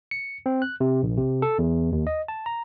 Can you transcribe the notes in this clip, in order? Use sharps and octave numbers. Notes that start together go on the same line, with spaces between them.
C#7
C4
F#6
C3
A#1
C3
A4
E2
D#2
D#5
A5
A#5